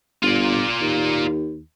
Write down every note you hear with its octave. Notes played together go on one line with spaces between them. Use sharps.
G1 F4 D5
D#2